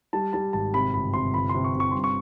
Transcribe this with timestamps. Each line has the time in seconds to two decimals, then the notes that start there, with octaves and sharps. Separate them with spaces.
0.13 G3 A5
0.33 G3 A5
0.53 G#1 A5
0.74 C3 B5
0.94 G1 B5
1.14 C3 C6
1.34 G1 B5
1.49 C6
1.55 C3
1.64 C#6
1.75 C3
1.80 C#6
1.92 G2 C6
2.04 C#6